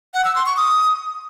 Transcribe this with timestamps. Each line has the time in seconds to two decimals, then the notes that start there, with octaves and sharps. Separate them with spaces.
0.14 F#5
0.25 E6
0.35 C6
0.46 C#6
0.57 D#6